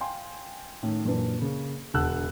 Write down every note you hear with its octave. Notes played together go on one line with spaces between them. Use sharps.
F5 G5 G#5 C6
A2 D#3 C#4
F#2 A#2 E3 D4
C#3 A#3
E1 D3 F#5 A5 E6 F#6